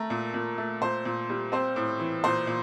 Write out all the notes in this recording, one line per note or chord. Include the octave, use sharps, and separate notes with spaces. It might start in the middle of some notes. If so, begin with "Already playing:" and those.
Already playing: A3 A#4
A#2
A#2
A3
A#2 C5
A#2
G3
C4 C5
A2
E3
A#2 C5
A#2